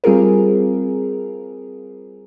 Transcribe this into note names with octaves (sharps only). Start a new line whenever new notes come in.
G3 C4 F4 G#4 A#4